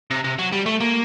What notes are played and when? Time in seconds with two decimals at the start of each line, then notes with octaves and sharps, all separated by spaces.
0.10 C3
0.24 C3
0.39 F#3
0.52 G3
0.66 A3
0.80 A#3